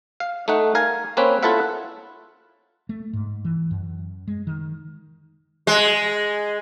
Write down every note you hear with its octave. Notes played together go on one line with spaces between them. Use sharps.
F5
A3 D#4 F#5
A#4 F5 G#5
A#3 C4 C#4 B4
E4 F4 A4 B4 E5 F#5
A3
G#2
E3
F#2
G#3
D#3
G#3